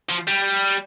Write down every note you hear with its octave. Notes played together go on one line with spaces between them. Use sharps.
F3
G3